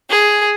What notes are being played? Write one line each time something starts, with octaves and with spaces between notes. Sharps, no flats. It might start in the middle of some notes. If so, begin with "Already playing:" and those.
G#4